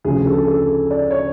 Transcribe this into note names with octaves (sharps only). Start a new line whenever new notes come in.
D2 C#3 F3 G#4
A4
A4
D5
C#5